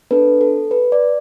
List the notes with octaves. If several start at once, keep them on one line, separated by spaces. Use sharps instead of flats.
B3 D4 A4 B4
A4
B4
D5